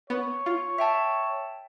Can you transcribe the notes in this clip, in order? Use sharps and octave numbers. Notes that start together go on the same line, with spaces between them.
B3 C#5
F4
E5 G5 A5